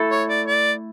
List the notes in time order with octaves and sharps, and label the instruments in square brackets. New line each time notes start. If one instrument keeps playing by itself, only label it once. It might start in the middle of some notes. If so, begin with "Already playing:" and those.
Already playing: [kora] A3 E4 A4
[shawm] C#5
D5
D5